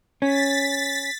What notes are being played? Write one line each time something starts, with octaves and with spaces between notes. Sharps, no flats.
C#4 A6 B6